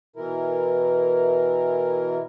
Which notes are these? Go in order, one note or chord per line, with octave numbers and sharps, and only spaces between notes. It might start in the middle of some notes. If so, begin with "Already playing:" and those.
B2 E3 E4 A#4